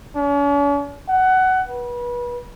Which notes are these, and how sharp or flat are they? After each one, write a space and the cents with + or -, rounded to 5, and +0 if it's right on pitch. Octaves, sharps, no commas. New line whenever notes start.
C#4 +45
F#5 +20
B4 -30